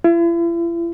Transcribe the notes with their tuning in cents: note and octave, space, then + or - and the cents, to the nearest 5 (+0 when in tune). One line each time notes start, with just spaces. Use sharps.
E4 +45